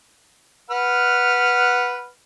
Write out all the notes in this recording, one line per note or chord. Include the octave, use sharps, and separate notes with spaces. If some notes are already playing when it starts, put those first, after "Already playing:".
B4 F#5 F6